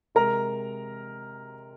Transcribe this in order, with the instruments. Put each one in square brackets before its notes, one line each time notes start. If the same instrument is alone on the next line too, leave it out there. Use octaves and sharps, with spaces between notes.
[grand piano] C3 G#3 A#4 A#5